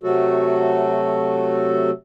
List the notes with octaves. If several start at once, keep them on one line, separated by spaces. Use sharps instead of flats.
C3 F#3 A3 F#4 A4